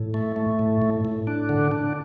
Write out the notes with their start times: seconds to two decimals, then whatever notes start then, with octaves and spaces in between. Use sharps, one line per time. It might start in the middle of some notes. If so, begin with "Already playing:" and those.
Already playing: A2
0.14 A3
0.36 A3
0.59 A2
0.82 A2
1.05 A2
1.27 D4
1.49 D3
1.71 D4